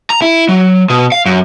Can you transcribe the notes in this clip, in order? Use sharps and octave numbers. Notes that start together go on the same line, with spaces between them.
A#5
E4
F#3
B2
F5
F#2